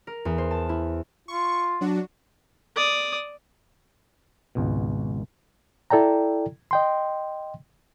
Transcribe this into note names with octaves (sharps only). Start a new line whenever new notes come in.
A#4
E2
C5
A5
E4
F4 C#6
F#3 D4 F#4
D5 D#6
G#1 C#2 B2
E4 A4 D5 G5 A#5
D#5 G5 C6